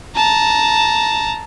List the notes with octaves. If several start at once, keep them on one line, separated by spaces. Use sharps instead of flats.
A5 A#5